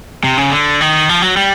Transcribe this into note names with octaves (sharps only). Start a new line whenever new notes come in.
C3
C#3
D3
D#3
F3
F#3
G3